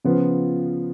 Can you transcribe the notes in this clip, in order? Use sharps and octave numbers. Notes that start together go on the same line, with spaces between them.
C#3 F3 B3 F4